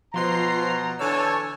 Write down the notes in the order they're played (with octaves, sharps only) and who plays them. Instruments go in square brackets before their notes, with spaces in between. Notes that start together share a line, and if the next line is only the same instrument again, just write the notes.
[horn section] B2 A#5 [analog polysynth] F3 C6 C7
[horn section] D3 E3 C#5 [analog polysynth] G#5 A5 E6